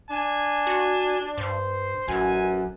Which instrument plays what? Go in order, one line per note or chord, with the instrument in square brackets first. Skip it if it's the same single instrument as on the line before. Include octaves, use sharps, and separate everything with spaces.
[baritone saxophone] D4 [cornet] G#5
[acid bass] F#4
[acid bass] G2 [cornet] C5
[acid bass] A1 [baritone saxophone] F#2 [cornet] G#5